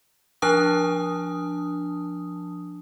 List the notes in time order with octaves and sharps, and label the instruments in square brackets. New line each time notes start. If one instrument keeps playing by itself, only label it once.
[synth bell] F3 D4 A5 D#6